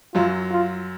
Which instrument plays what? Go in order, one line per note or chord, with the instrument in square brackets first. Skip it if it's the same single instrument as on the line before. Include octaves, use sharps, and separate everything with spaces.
[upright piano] F#2 F#3 [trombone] F4
[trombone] F4